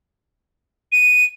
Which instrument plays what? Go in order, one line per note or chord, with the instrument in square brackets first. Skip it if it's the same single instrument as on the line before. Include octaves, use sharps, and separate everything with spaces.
[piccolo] D#7